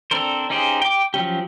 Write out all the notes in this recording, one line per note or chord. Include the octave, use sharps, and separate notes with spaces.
C4 D4 A4 A#4 C5
C#4 D#4 G4 G#4 C5
G5 D6
F3 F#3 C#4 G4